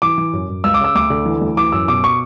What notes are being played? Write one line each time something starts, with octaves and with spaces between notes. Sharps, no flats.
E3 D6
E3
F#2
F#2
C#2 E6
D6
C#3 E6
D2 D6
D3
E3
D2
E3 D6
F#2 E6
B2 D6
C#6